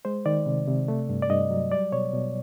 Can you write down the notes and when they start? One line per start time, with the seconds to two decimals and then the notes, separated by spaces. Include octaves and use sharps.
0.05 G#3 C5
0.26 D#3 D5
0.46 C3
0.67 C3
0.88 A3
1.09 G2
1.22 D5
1.30 G2 D#5
1.51 F#3
1.72 G3 D5
1.92 B2 C#5
2.13 B2